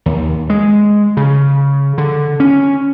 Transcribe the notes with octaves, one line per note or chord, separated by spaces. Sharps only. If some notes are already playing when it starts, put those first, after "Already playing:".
D#2
G#3
C#3
D3
C#4